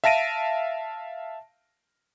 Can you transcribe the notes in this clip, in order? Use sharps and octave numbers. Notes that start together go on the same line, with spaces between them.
E5 F5 A5 A#6 D7 D#7